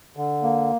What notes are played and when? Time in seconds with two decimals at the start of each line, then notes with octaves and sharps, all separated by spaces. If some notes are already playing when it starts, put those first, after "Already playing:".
0.17 D3
0.43 A#3